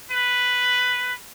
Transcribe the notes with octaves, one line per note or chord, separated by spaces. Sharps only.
B4